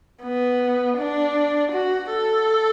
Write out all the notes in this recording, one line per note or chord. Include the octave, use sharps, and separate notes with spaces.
B3
D4
F#4
A4